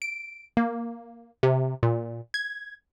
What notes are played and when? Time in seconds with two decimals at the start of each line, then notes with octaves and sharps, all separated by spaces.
0.02 D7
0.57 A#3
1.43 C3
1.83 A#2
2.34 G#6